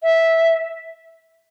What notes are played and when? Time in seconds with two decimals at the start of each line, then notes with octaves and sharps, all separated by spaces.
0.03 E5